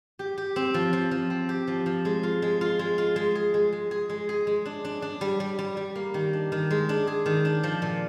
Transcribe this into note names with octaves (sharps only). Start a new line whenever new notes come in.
G4
G4
C4
F3
F3
F3
C4
G4
F3
F3
G#3
F4
G#3
F4
G#3
F4
G#3
G#4
G#3
G#3
G#4
G#3
G#4
G#3
D4
D4
D4
G3
G3
G3
G3
A#3
D#3
D4
D#3
G#3
D4
G#4
D#3
D4
F3
A#2